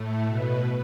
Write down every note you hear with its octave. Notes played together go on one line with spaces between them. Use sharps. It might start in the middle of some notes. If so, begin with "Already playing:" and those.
Already playing: A2 A3
B2 B3